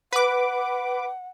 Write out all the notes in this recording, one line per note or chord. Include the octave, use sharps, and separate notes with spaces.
B4 F#5 D6